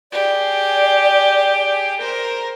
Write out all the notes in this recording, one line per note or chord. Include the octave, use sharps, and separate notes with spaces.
G4 G#4 D5
A#4 C5